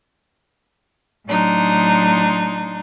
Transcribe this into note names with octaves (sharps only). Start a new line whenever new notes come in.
A2 F#3 D4 D#4 C6